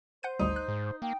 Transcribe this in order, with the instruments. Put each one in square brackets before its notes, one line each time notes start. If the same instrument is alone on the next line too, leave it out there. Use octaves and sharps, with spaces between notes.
[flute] C5 [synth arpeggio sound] F#5 G6 D#7
[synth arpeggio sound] G#1 D2 G3 [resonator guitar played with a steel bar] D#4
[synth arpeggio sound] F#6
[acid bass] G#2
[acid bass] A#3 [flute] G5